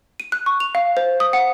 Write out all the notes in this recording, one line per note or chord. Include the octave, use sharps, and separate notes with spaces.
D#7
F#6
C#6
F7
F5
C5
D#6
F#5